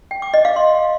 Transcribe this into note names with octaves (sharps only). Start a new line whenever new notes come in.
G5
D6
D#5
F5
C6